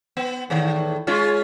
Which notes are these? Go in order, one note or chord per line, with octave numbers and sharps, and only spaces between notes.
B3
E2 A2 D#3
G#3 C#4 F4